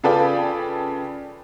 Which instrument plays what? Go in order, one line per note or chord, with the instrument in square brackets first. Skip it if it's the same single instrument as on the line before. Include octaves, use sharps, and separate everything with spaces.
[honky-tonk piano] C#3 F4 A4 B4 D5 G5